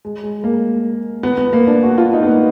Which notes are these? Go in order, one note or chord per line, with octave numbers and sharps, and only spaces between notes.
G#3
G#3
A#3
B3
B3
A#3
D4
F#4
F4
D#4
B3
A#3